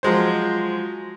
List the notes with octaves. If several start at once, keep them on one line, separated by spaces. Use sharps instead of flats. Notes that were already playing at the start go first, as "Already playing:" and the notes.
F3 F#3 G#3 C5